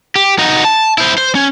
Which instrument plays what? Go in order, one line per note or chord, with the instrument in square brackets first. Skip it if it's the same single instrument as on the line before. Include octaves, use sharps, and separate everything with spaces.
[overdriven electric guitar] G4
D#4 F#4
A5
E4 C5
C5
C#4